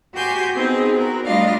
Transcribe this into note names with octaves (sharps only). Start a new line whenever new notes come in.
F#4 G4 G#5 C6 G6
B3 C4 D#4 G#4
F#4 A#4
G3 A3 D4 F4 D#5 F5